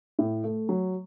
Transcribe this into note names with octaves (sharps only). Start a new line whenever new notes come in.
A2
A3
F#3